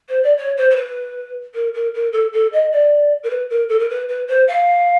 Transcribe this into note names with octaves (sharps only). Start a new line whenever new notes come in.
C5
D5
C#5
C5
C5
B4
A#4
A#4
A#4
A4
A4
D#5
D5
A#4
B4
A#4
A4
A#4
B4
B4
C5
F5